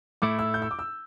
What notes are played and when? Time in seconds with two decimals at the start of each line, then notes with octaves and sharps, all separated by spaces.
0.22 A2 A3 E4 D6
0.39 E6
0.54 G6
0.62 E6
0.71 D6
0.79 E6